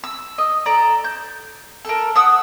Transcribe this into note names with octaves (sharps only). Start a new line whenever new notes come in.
E6
D#5
A4 D5 A#5
G6
A4 A#4
F#5 D#6 E6